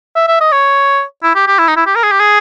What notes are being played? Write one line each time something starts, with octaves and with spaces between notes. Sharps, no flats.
E5
E5
D#5
C#5
E4
G4
G4
E4
D#4
E4
G4
A#4
G#4
G4
G#4